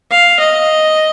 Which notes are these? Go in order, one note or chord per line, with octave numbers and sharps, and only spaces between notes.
F5
D#5